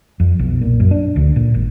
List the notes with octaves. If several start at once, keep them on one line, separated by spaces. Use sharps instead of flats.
F2
B1
A#2
F#2
D4
D2
A#2
G#1